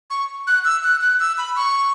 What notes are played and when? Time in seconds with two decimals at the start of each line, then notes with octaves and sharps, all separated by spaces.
0.10 C#6
0.47 F#6
0.65 E6
0.84 F#6
1.01 F#6
1.20 E6
1.38 B5
1.56 C#6